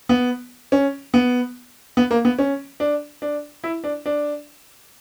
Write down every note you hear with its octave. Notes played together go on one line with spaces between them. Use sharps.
B3
C#4
B3
B3
A#3
B3
C#4
D4
D4
E4
D4
D4